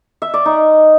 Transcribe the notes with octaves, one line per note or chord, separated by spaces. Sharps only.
E5
D5
D#4